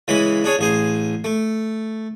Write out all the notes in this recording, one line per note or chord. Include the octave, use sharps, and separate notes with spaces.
C#3 E3 G#3 B5
D4 G#4 C#5
A1 G#4 C5
A3